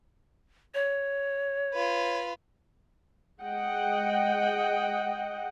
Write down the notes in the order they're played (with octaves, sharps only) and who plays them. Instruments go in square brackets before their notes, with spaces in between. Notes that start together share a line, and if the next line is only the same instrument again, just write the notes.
[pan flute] C#5
[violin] F4 B4
[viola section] G#3 D#5 F#5 G5